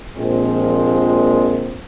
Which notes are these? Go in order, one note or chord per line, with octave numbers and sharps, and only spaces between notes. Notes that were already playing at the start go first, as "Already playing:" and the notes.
A#1 A#2 F3 G#3 C4